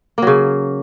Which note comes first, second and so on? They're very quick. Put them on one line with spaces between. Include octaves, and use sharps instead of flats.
A#3 F#3 C#3